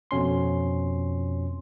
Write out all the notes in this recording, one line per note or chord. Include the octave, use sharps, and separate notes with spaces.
F2 B2 C#4 C6